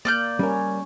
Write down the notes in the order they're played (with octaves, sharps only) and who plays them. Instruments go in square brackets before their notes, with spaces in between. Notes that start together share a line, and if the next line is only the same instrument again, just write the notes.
[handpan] A#3 [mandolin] D5 F6 G6
[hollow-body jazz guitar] G3 A#4 [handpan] C#4